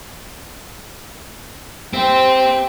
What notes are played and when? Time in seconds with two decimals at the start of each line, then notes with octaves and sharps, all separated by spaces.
1.93 C4 G4 C5 E5 G5